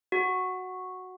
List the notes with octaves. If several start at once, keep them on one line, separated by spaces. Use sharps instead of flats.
F#4